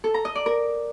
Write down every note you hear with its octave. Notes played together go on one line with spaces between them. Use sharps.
A4
A#5
D#5
D5
A#4